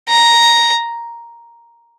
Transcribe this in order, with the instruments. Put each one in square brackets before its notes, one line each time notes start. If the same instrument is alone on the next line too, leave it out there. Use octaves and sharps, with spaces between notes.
[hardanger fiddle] A#5